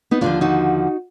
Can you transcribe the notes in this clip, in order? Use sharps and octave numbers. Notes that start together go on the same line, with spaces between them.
B3 D#4
D#2 D3 F3 D4 F4
D#4 F#4